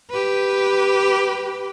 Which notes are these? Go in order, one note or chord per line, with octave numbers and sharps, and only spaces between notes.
G4 B4